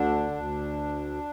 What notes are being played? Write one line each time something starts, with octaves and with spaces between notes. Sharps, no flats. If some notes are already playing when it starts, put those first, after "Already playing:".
Already playing: D2 D3 D4
D2